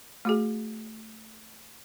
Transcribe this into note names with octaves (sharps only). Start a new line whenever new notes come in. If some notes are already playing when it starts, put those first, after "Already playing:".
A3 F#4 G#4